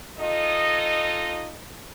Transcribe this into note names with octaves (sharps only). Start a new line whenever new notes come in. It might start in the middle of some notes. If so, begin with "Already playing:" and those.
D#4 F4 A4 D#5